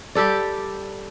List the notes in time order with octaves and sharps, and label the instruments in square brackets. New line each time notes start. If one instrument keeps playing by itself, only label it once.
[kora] G3 G4 A4 D5